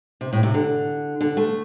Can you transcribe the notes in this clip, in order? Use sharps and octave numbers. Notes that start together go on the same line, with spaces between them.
C3
A2
C3
D3
D3
A3